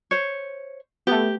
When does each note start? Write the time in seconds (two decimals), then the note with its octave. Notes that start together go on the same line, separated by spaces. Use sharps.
0.11 C5 C#5
1.07 A3 B3 G4